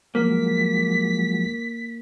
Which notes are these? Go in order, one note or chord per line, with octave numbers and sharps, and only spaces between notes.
F3 F#3 G#3 A#3 B6